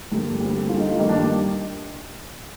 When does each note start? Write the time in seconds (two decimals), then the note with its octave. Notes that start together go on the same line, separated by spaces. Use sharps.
0.12 G2 D3 G3 A#3
0.40 D2 D3 G3 C4 G4
0.55 G4
0.69 D2 D3 G3 F4
0.79 D#4
0.90 F4
0.99 G2 D#3 G3 A#3 D#4
1.09 D4
1.19 D#4